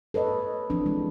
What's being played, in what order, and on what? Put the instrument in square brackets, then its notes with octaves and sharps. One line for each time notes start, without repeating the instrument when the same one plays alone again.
[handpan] A4 B4 C#5 D#5
E3 F3 C4 D4
G#3